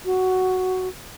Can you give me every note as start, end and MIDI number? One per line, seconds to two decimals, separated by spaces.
0.05 0.88 66